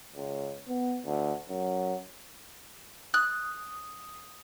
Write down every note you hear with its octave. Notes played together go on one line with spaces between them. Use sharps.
C#2
B3
D2
F#2
D#6 F#6